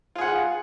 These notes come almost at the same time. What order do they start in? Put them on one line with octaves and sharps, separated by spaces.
F4 G#4 F#5